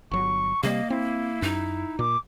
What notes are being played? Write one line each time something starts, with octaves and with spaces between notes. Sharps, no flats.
G1 F#3 C#6
C3 G3 A#3 D#5
C4 E4
F#2 D#4
A#2 D6